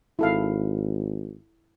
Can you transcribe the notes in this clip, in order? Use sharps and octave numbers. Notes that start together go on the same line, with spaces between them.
G#1 E4 A4 F5